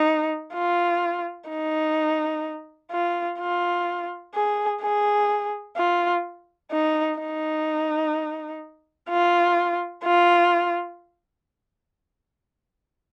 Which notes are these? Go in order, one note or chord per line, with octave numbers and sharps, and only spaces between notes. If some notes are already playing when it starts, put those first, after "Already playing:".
Already playing: D#4
F4
D#4
F4
F4
G#4
G#4
F4
D#4
D#4
F4
F4